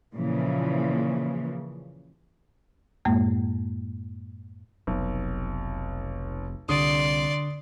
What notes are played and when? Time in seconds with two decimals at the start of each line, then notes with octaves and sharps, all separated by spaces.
0.15 A#2 C#3 E3 F3
3.05 F#2 A2 G#3 A#3
4.87 F1 B1
6.69 C2 D3 D5 C6 D#6